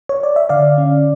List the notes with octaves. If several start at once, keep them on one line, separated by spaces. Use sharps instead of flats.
C#5
D5
E5
D3 D5 F5
C#4